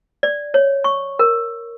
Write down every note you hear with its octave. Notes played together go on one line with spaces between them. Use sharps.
D5
C#5
C#6
A#4